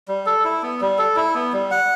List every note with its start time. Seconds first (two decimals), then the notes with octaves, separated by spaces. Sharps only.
0.08 G3
0.26 A4
0.45 E4
0.63 B3
0.81 G3
0.98 A4
1.16 E4
1.35 B3
1.53 G3
1.71 F#5